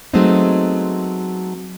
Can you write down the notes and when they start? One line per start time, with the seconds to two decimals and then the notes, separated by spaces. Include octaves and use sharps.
0.13 F#3 G#3 A3 B3 C4 D#4